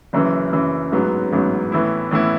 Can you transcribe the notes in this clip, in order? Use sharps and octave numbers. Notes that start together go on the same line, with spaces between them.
F#1 F#2 E3
F#1 F#2 E3
A1 G#2 F#3 B3
A1 G#2 F#3 B3
A2 E3 B3 E4
A2 E3 B3 E4